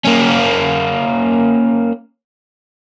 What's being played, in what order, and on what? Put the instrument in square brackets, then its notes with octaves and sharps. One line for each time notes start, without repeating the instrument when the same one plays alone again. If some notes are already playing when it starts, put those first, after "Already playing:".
[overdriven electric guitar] A#3 C#4